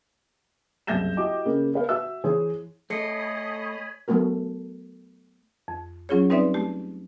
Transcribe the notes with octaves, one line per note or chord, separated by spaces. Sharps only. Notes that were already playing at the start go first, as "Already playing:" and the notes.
F#1 C2 E5 G6 A#6 E7
E4 F#4 G4 D#5 D6
C#3 A#3
A#4 B4 F5
F#4 E5 E6
E3 G#4 C5 C#5
A3 A4 C#5 D#5 G#5 B5 C7 C#7
F#3 A3 B3 F#4 A#4
F2
F#3 C#4 F4 G#4 C#5
G3 C4 D#4 B4 D5 E5
A3 G4